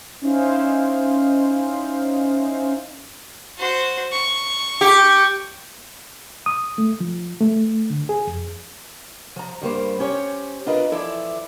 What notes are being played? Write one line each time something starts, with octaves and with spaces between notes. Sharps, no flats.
C#4 D#4 E4 C5 F5
F#4 C5
C#6
G4
D#6
A3
F3
A3
D3
G#4
F2
F3 A#5
G2 G3 A#3 C5
C#4 G4 C5 C#5
D4 F4 A#4 B4 D#5
E3 F3 E4 A4 D5 E5